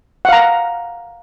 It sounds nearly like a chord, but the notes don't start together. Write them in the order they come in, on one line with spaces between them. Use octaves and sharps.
F#5 F5 A#5